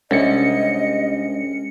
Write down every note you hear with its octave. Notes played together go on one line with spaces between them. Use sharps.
C2 G#3 C#4 D4 G4 D#5 C#7